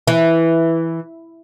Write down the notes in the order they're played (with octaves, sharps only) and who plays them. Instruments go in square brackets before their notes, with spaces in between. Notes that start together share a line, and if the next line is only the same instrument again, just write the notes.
[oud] E3